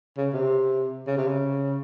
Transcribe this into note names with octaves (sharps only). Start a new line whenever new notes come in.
C#3
C3
C#3
C3
C#3